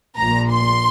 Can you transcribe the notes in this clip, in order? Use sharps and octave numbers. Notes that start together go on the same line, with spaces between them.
A#1 A#2 A#5
C6